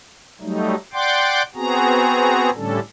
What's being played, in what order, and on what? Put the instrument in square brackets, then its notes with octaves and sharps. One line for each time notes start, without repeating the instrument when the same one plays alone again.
[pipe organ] F#3 G3 A3 D#4
D5 F#5 G5 C6 D6
B3 C4 F#4 G#4 A#5
A2 D3 G3 C#4 D4 A4